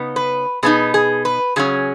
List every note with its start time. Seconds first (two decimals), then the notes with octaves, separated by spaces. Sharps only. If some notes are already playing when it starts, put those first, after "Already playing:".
Already playing: C#3 B3 D#4
0.16 B4
0.63 B2 B3 D#4 G#4
0.94 G#4
1.25 B4
1.56 C#3 F#3 C#4 G#4